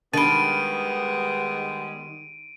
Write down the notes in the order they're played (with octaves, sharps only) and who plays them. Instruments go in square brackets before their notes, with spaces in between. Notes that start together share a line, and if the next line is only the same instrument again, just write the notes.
[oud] D#3 [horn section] G3 G#3 B3 [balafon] D4 B5 [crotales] D7 D#7